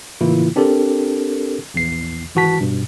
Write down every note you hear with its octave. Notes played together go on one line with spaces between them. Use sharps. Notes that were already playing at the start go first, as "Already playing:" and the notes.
A2 C#3 E3 A#3 E4 F4
C4 D4 G4 A4 A#4
A#1 E2 C7
G#1 E3 F#4 A5 B6
G2 B2